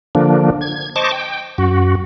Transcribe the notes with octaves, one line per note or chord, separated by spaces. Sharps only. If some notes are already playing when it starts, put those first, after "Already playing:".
D3 F3 A#3 D4
G#6
C5 D#5 A5 C#6 D6
G5
F#2 F#4